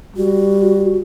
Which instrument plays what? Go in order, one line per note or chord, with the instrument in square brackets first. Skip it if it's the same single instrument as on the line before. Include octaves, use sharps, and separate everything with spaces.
[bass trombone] G3 [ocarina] F#4